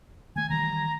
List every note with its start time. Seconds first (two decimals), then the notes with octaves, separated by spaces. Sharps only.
0.36 D#3 A3 G#5
0.50 D#3 E3 G3 A#5